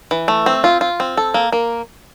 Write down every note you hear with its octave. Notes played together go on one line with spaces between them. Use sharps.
E3
A3
C4
F4
F4
C4
A4
A#3
A#3